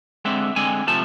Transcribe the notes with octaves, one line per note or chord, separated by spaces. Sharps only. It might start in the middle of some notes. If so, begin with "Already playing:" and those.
D3 G#3 C4 E5
D3 G#3 C4 G#5
C3 F3 A3 A5